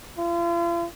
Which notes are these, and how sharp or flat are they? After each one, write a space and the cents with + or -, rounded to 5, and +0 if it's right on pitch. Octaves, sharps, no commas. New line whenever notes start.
F4 -40